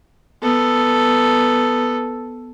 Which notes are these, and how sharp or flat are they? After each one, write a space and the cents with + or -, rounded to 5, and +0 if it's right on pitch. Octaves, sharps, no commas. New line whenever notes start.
B3 +0 A4 +0